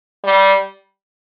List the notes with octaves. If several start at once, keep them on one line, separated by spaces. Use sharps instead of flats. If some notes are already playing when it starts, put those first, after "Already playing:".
G3